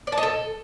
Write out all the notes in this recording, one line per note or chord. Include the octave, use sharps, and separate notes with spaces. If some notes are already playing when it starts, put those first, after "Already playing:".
D5
A5
D#5
A4